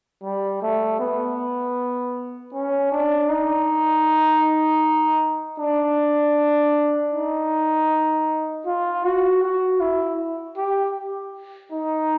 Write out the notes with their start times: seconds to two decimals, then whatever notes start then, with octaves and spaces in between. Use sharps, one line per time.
0.23 G3
0.62 A3
1.00 B3
2.53 C#4
2.92 D4
3.29 D#4
5.60 D4
7.13 D#4
8.66 F4
9.04 F#4
9.43 F#4
9.80 E4
10.57 G4
11.72 D#4